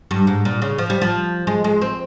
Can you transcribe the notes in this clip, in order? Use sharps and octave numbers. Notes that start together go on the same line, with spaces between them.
G2
G#2
A#2
C#3
F3
G3
F3
G#3
G#3
C4